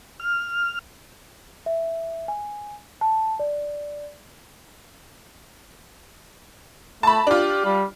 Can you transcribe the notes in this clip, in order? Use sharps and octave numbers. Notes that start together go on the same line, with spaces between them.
F6
E5
G#5
A5
D5
A3 A5 B5
D4 F4 G4
G3